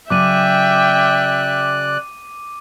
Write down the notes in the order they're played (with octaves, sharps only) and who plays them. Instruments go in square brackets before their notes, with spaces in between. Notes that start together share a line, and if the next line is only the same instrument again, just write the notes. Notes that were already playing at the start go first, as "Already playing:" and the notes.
[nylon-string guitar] C#3 F#3 [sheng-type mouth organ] D5 F#6 [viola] E5 G5 [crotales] D6 D#7